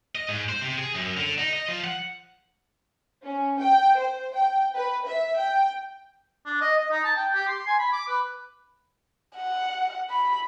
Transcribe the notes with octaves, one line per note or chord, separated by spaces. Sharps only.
D#5
G#2
C5
C3
G#4
F#2
D3
D#4
D#5
F3
F#5
C#4
G5
C5
G5
B4
E5
G5
D4
D#5
D#5
D#4
A5
G5
G4
C6
G#5
B5
D6
B4
F#5
B5